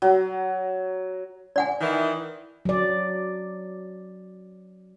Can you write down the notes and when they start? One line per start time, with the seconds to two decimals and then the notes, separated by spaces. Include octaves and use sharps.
0.02 F#3
1.56 D5 F#5 G#5
1.81 D#3 E3
2.65 F#3 D5